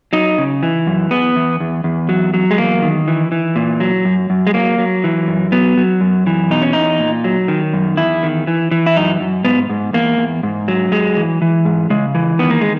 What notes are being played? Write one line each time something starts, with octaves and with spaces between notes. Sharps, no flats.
F#3 D#4
C#3
E3
F#2
E2 B3
E2
E2
E2
F#3
F#3
G#3
E2 A#3
D#3
E3
E3
A#2
F#3
F#2
F#2
G#3
F#3 A#3
F#3
E3
F#2
F#3 B3
F#3
F#2
E3
B2 D#4
C#4
E2 D#4
A#2
F#3
D#3
F#2
E2 E4
D#3
E3
E3
E4
F#2 D#4
F#2
G#2 B3
G#2
E2 A#3
E2
G#2
F#3
F#2 G#3
E3
E3
G#2
C#3 G#3
E3
D#3 B3
A#3
G#3